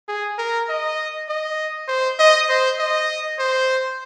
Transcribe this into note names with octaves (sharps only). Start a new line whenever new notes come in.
G#4
A#4
D#5
D#5
C5
D#5
C5
D#5
C5